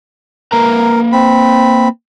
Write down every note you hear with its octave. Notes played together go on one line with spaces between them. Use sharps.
A#3 A#4 B4 A#5
C4 B5